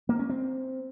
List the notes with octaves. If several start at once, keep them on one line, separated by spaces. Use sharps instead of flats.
A#3
C#4
C4